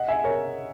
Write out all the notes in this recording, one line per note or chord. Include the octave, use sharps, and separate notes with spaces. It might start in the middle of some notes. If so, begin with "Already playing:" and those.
Already playing: D#5 F#5
E5 G#5
A#4 C#5